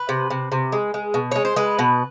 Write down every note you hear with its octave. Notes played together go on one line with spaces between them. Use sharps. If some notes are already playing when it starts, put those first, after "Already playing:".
Already playing: B4
C3
C3
C3
G#3
G#3
B2
G#3 C#5
C5
G#3 B4
B2